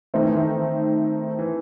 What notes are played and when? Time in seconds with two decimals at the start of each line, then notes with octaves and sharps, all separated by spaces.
0.14 D#3 A3 C4 D#4
0.24 E3
0.35 D#3
1.39 E3